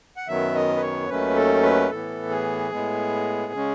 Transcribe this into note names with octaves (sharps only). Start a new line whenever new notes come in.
F#5
F#2 D#3 F#3 B3 E5
D#5
B4
C#5
D#2 D#3 F#3 A3 C#4 B4
A4
B4
A2 E3 B3 A4
G#4
A2 G#3 B3
C#3 G#3 C#4